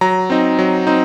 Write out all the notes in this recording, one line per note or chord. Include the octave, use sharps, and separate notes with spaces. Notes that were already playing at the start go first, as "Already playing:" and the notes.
F#3 A#5
C4 D#4
F#3
C4 D#4